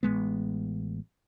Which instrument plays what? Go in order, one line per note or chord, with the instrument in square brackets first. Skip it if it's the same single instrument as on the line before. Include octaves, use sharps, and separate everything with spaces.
[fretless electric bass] A1 G#3 B3